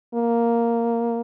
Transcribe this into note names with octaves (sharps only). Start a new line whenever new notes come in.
A#3